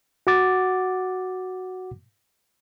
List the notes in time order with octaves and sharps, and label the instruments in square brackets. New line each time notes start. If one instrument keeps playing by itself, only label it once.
[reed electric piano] F#4 F#5 D6 A6